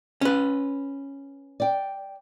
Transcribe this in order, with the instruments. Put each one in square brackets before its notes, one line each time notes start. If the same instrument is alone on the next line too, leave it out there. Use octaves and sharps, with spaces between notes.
[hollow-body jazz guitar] C#4 B4
[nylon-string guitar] D5 G5